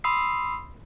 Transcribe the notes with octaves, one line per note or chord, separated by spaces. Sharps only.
B5 C6 D#6 E6 C7